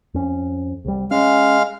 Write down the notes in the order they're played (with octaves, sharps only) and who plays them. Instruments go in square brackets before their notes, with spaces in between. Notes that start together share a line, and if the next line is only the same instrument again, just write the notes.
[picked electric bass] F2 C#4
C2 G3
[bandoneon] G#3 F5 F6 [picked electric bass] C#4